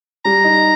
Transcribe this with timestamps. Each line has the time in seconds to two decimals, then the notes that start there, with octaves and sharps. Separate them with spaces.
0.25 G3 A#5
0.44 D#4